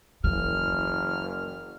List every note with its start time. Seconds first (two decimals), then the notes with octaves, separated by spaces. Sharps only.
0.24 F#1 E3 F6